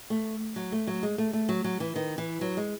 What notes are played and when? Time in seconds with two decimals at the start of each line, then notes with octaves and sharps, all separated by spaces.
0.10 A3
0.56 F#3
0.72 A3
0.87 F#3
1.03 G#3
1.18 A3
1.33 A3
1.49 F#3
1.64 F#3
1.80 E3
1.96 D#3
2.18 E3
2.41 F#3
2.57 G#3